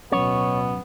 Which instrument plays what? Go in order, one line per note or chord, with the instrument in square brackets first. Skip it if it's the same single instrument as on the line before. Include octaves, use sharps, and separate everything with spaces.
[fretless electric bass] D1 F#3 C#4 [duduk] B2 [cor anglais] B3 [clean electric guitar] C#5